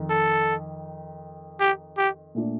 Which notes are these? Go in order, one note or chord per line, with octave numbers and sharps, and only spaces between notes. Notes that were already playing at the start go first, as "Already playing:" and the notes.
Already playing: F2 D#3
A4
G4
G4
A#2 A3 D4